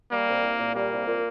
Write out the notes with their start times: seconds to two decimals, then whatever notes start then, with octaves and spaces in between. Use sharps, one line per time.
0.11 G3 A#3
0.27 C2
0.43 C2
0.60 A#2
0.75 G3 A#3
0.91 C2
1.07 A#2